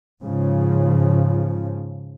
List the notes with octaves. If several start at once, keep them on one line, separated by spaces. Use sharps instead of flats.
G#2 C#3 F3